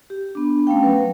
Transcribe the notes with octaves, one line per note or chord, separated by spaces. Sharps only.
G4
B3 D4
A3 C#4 F5 G5
F#3 A3 B4